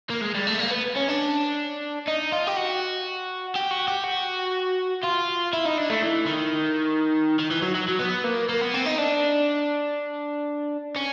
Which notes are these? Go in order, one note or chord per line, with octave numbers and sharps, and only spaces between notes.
A#3
G#3
G3
A3
A#3
B3
C#4
D4
D#4
F4
G4
F#4
G4
F#4
G4
F#4
F4
E4
D#4
D4
A3
E3
D#3
D#3
E3
F#3
F#3
F#3
B3
A#3
A#3
B3
C4
D#4
D4
C#4